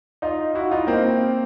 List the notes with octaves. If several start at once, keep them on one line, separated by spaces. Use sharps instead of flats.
D#4 F4
E4 F#4
D#4 F4
A#3 C4